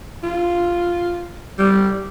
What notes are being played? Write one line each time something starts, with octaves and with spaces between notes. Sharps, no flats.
F4
G3